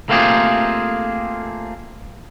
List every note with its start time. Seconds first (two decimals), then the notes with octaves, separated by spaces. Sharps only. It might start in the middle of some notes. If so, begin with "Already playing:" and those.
0.09 A3 A#3 C4 F4 G4 G#4